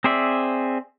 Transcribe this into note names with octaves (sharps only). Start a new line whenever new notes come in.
C4 G#4 C5 D5 E5